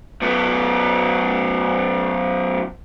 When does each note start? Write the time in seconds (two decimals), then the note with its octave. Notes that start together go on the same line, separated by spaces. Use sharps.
0.22 F#2 B3